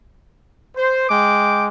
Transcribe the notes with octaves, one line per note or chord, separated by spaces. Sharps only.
C5
G#3 G5 D6